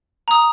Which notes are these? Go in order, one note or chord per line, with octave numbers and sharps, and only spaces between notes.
A#5 D#6